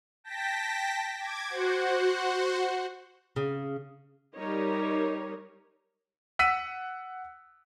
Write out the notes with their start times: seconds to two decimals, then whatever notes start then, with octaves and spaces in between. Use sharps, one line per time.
0.24 G5 A5 A#6 B6
1.19 D6 G#6
1.48 F#4 C5 F#5
3.36 C#3
4.37 G3 D#4 A#4 C#5
6.39 F#5 E6 B6 D#7